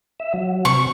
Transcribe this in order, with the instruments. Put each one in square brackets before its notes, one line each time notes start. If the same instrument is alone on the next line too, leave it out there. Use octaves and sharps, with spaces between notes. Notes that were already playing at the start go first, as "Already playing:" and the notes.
[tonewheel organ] E5
F#3
[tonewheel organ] C3 [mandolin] C#6